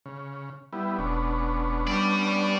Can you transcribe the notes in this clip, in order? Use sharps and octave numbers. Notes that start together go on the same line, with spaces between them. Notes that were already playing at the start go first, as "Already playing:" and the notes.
C#3
G3 B3 E4
E1 B3 C#4 D4
G3 G4 D5